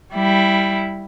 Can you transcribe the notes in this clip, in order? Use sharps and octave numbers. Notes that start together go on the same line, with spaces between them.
G3 E4